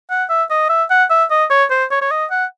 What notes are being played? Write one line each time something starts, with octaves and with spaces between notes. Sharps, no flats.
F#5
E5
D#5
E5
F#5
E5
D#5
C#5
C5
C#5
C#5
D#5
F#5